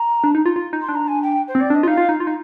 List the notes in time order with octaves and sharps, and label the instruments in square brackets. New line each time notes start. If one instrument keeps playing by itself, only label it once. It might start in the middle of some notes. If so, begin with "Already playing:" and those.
Already playing: [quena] A#5
[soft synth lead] D4
D#4
F4
F4
D#4
[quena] C6
[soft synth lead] D4
[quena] A#5
G#5
G5
C5
[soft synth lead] C4
[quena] D5
[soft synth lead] D4 [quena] D#5
[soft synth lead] F4
[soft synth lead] D#4 [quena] F5
[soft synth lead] F4
D#4
F4
D#4